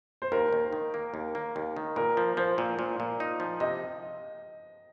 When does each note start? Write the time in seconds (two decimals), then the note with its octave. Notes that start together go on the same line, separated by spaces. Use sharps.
0.22 C5
0.32 D#2 A#4
0.53 D#2
0.73 D#3
0.94 A#3
1.14 D#2
1.35 A#3
1.56 D#2
1.77 D#3
1.96 A#2 A#4
2.17 F3
2.37 F3 C5
2.58 A#2
2.79 A#2
3.00 A#2
3.20 D#4
3.40 F3
3.60 C3 D#5